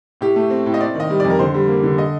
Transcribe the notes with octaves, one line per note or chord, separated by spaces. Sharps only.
A2 G4
A3
C4
A2
D#5
C4 D5
D#3 D#5
G3
F2 D5
A#4
D3 C5
G3
A#3
D3
D#5